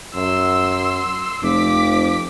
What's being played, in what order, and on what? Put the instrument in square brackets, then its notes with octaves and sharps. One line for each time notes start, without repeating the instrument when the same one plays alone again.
[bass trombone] F#2 [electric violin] C6 E6
[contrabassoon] F1 [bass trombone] F2 [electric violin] D6 B6